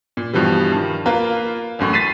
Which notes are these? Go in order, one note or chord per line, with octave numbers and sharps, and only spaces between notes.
A#2
G2 B2 E3 F3 G3
G2 D#3
A#3 F4 A#4 B4
A1 F#2 A2 C#6
A6 B6 C7 D#7